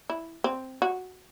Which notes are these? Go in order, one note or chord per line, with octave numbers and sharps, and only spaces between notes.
E4
C4
F#4